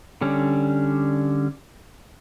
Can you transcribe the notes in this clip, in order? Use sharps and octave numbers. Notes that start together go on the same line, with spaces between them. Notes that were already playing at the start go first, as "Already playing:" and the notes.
D3 G3 C#4